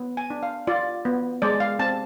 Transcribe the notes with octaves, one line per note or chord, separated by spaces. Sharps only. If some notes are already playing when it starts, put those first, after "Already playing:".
Already playing: B3
G#5
D4
F5
F4 D5
B3
G#3 D5
F5
C4 A5